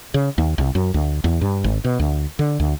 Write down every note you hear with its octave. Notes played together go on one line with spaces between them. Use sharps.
C#3
D#2
C2
F#2
D2
E2
G2
G#1
B2
D2
D3
D2